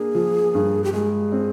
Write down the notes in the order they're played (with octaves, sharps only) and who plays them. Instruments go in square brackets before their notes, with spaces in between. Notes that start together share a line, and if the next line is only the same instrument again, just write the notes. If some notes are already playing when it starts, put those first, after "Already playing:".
Already playing: [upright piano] A#3 D4 [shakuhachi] G#4
[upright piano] F3
G2
[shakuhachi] G4
[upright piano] G#3 [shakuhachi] G#4
[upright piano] C4